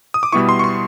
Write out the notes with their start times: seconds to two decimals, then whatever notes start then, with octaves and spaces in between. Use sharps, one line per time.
0.14 D#6
0.23 D6
0.32 B2 G3 B3 E4 C#6
0.49 C6
0.59 C#6
0.64 C6